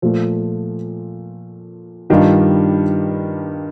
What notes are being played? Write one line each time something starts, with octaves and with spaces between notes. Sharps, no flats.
A#2 F3 A3
G2 D#3 G3 D4 F4